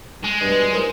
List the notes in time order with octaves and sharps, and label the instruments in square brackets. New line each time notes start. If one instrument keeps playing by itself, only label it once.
[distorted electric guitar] G#3
[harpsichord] G2 B2
D#3 F3